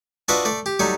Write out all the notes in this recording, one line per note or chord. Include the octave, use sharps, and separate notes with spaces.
D4 F4 F#4 B4 D#5 E5
A3 D5
G4
F#3 G3 A3 D#4